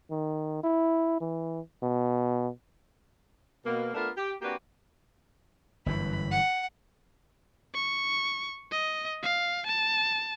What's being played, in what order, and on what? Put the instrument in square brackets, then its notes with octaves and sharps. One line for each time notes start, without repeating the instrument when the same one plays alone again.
[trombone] D#3
E4
E3
B2
[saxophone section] B2 A#3
A3 B3 D4 F4 A#4
G4
A#3 C4 D4 F#4 G4 B4
[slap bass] G1 F#2 E3 [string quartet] B5
[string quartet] F#5
[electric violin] C#6
D#5
F5
A5